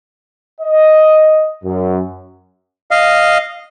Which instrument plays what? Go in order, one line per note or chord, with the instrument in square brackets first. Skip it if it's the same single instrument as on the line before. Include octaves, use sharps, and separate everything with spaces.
[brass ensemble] D#5
F#2
[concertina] D#5 F5